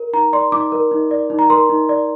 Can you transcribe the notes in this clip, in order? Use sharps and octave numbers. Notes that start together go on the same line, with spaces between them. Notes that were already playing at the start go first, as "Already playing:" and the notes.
Already playing: A#4
D#4 A#5
D5 C6
D#4 D6
A#4
D#4
D5
D#4
A#5
A#4 C6
D#4
D5